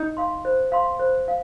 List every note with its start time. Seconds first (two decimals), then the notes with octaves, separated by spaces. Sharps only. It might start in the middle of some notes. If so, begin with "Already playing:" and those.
Already playing: D#4
0.17 F5 C6
0.45 C5
0.72 F5 C6
0.99 C5
1.28 F5